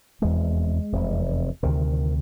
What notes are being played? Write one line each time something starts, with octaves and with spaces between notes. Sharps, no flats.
F1 E2 C3 G#3
F1 E2 C3
D2 C3 D#3